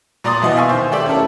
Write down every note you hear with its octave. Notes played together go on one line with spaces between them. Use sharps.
A#2 D5 A#5 C6 D#6 A6
B2 E3 D#5 F#5 G#5
E5 F5 G#5 C#6
D#3 C5
A3 G4 D5 E5
C#4 E4 A4 A#4